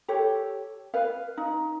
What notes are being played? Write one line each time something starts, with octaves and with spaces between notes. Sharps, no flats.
G4 A4 C#5
B4 F5
D#4